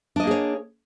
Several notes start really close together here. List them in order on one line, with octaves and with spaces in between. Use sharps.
D4 D#5 A#3 G#4 C#5